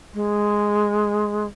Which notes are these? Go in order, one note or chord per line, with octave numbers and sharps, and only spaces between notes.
G#3